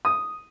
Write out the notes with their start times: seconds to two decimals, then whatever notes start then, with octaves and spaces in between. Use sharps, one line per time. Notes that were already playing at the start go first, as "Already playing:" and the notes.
0.05 D#6